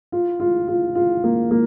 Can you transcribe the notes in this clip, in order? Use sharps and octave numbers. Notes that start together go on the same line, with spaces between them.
F4
F4
F4
F4
A#3
A#3